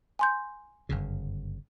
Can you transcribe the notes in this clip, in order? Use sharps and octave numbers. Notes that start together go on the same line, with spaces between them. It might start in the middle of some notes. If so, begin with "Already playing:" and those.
G#5 C6 G6
G1 F#2 C#3